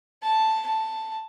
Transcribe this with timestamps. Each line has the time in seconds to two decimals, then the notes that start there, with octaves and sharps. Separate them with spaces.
0.22 A5
0.67 A5